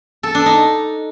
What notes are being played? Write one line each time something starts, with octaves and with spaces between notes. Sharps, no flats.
A4
D4
D#4